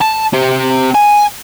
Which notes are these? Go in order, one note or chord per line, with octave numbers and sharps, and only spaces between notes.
A5
C4 G4
G#5